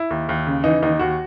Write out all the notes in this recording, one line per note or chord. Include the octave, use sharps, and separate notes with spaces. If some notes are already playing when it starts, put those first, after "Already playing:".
Already playing: E4
D#2
D#2
C#3
E3 D#4
D#2 D#4
D#2 F#4